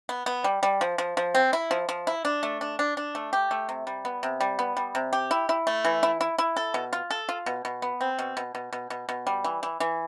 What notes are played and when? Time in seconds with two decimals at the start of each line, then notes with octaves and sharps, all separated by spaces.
0.09 B3
0.26 B3
0.44 G3
0.63 G3
0.81 F3
0.98 F3
1.17 F3
1.35 C4
1.53 E4
1.71 F3
1.89 F3
2.07 E4
2.25 D4
2.43 A3
2.61 D4
2.79 D4
2.97 D4
3.15 A3
3.33 G4
3.51 A3
3.69 C3
3.87 G3
4.05 B3
4.23 C3
4.40 G3
4.59 B3
4.77 G3
4.95 C3
5.13 G4
5.31 E4
5.49 E4
5.67 A3
5.85 E3
6.03 E4
6.21 E4
6.38 E4
6.57 A4
6.74 B2
6.93 F4
7.11 A4
7.29 F4
7.46 B2
7.65 B2
7.82 B3
8.01 C4
8.19 B2
8.37 B2
8.55 B2
8.73 B2
8.90 B2
9.09 B2
9.27 G3
9.44 E3
9.63 E3
9.80 E3